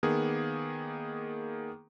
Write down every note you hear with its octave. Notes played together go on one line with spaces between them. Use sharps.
D#3 A#3 B3 G#4